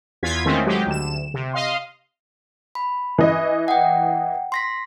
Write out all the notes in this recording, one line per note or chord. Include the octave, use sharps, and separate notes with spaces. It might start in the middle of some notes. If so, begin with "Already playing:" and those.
E2 F4 G#6 B6
D#3 G#3 A3 C4 C#4
F#3 G#3 G4
D2 E7
C3
D#5 F5 C6
B5
E3 D#5
F#5 G5
C6 A#6 B6